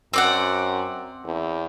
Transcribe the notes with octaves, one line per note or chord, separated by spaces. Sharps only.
F#2 C4 D5 F#5
E2